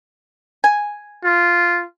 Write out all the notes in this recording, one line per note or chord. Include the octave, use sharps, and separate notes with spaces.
G#5
F4